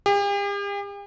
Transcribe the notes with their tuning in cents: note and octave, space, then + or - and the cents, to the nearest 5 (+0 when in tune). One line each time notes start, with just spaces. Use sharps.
G4 +45